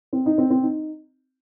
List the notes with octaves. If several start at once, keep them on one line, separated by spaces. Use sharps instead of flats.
C4
D#4
C4
C4
D#4